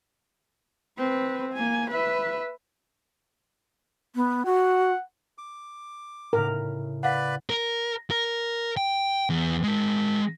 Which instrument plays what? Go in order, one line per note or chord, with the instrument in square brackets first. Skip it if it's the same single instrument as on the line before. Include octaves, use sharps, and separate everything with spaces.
[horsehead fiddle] C4 B4
A#3 G#5
B4 E5
[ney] B3
[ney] F#4 [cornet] F#5
[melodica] D6
[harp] A2 C#3 [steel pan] A#4
[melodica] B4 D5 B5 [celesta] F5 F#5
[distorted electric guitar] A#4
A#4
G5
E2
G#3 A#4